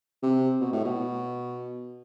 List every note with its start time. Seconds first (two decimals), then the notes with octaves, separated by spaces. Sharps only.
0.23 C3
0.60 B2
0.73 A2
0.84 B2